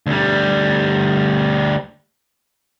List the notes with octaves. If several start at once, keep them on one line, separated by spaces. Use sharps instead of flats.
D2 G3